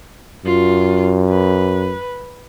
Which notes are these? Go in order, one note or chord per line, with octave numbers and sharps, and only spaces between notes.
F#2 F4
B4